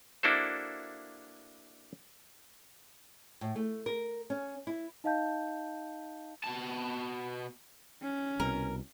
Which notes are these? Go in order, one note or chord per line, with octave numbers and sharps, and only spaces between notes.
A#3 D4 E4 F#4 A4 C5
A2
A3
A#4
C#4
E4
D#4 D#5 F5 A5 G6
B2 A5
C#4
C2 B2 A#4